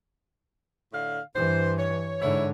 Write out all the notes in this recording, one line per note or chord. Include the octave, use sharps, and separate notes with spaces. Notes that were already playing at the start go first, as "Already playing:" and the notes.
A2 D3 F5
G2 E3 C5
C#5
G#2 D3 E4 C#5